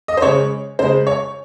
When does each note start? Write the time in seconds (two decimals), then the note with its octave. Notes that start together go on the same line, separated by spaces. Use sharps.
0.08 D#5
0.17 C5
0.22 C#3 G#3 C#5
0.79 C#3 G#3 C5
1.07 C#5